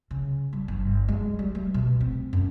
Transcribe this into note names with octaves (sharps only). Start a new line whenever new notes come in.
C#3
G3
G1
G#3
G3
A3
B2
C4
F#2